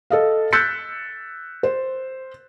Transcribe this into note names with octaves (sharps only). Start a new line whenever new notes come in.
A4 D#5 F5
E6 F#6 G6 A6 B6 C#7
C5